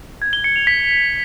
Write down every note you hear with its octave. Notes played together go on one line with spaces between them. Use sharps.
G#6
G7
C#7
F7
B6